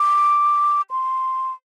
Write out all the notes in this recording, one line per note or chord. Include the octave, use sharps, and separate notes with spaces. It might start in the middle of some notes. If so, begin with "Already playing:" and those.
Already playing: D6
C6